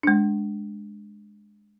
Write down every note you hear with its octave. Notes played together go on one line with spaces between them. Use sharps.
G#3 D4